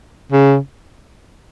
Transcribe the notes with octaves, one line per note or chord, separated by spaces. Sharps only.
C#3